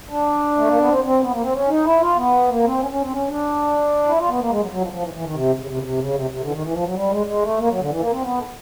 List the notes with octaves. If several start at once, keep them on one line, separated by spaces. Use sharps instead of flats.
D4
A3
A#3
B3
C4
C4
B3
A#3
C4
C#4
D#4
E4
F4
B3
A#3
C4
C#4
C#4
C4
C#4
D4
E4
F4
B3
A#3
G#3
F#3
F#3
F3
F3
E3
E3
D#3
C3
C#3
C3
C#3
C3
C#3
C3
C3
D3
E3
D#3
E3
F3
F#3
G3
G#3
G#3
A3
A#3
F#3
D3
E3
A#3
C4
B3
A3